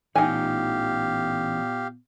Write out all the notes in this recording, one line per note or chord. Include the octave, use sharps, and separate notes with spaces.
A1 A#2 E3 B3 D#4 G4 F5 G#5